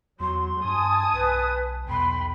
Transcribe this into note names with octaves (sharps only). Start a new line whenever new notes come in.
E2 F#3 C6
G2 G#5 A5 D#6
B1 B4
B1 E2 G5 B5 C6